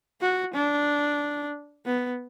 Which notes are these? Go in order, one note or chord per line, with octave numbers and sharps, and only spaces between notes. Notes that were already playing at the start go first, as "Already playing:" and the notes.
F#4
D4
B3